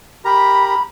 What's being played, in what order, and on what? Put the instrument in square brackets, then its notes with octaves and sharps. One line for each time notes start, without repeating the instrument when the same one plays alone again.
[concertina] G4 A#4 A#5 [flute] B5